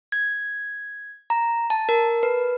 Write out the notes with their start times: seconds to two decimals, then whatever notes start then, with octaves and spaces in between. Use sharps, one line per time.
0.12 G#6
1.30 A#5
1.70 A5
1.89 A#4
2.23 B4